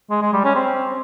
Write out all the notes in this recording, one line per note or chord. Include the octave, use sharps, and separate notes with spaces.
G#3
G#3
G3
C#4
C4